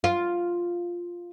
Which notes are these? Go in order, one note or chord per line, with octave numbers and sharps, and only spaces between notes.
F4